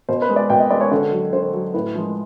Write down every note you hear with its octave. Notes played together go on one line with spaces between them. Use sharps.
B2 C5
B4
G#3
D5
B2 G5
D#5
G#3 D5
C#5
D3 C#5
F#3
D3 C5
F#3
A2 B4
F3 G#3